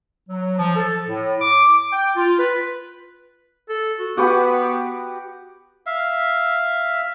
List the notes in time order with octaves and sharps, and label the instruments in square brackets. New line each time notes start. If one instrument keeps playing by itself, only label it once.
[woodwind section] F#3
F3
A4
A2
D6
G5
F4
B4
[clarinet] A4
F#4
[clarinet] B3 [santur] F#4 G4 B4
[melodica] E5 F5